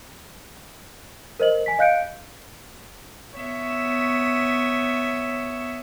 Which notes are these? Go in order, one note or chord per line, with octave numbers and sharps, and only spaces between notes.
A#4 C5 D#5 F#7
G#5 B6
D#5 F5 F#6 G6 C#7 D7
B3 C#5 E5